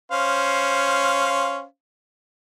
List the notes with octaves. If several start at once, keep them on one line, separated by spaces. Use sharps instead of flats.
C#4 C5 F5